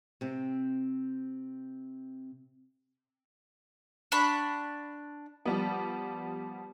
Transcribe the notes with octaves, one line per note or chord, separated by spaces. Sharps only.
C3 C4
D4 F#5 B5 C#6
F3 G3 B3